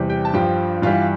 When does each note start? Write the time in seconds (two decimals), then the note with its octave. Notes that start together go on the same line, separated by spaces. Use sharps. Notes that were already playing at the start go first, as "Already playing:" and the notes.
Already playing: E2 C3 G3
0.09 G4 G5
0.25 A5
0.34 G2 F3 G4 G5
0.82 G2 E3 G3 F4 F5